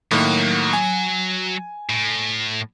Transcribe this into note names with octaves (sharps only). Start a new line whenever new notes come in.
A2 D#3 F#3 A#3 F#5
G#5
A2